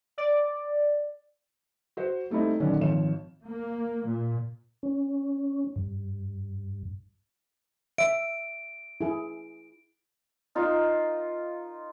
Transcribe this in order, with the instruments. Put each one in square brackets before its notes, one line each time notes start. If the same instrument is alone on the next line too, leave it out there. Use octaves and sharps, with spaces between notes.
[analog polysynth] D5
[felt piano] F#4 C5
G3 A3 C4 D#4 E4
A#2 D3 D#3 F#3 C#4 D4
G#1 F3 C#5 E7
[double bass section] A#3
A#2
[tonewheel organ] C#4
G2
[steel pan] E5 [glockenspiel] D7
[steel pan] E4 G#4
[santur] D#4 F4 A#4